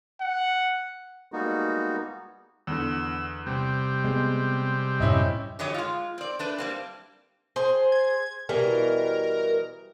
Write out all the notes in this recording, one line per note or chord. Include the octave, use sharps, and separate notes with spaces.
F#5
G3 G#3 A#3 B3 D#4 F#4
E2 D3 E6
C3 G3
G#3 B3
F#2 A2 C#4 E4 D#5
D3 E3 F#3 G4 C#5 D#5
G#3 F4
C4 D5
A3 D4 B4
G3 A#3 C4
G#4 C5
G#6
B2 E3 G3 A#4